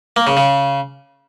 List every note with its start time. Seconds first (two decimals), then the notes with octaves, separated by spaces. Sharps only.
0.16 A#3
0.27 C#3
0.37 C#3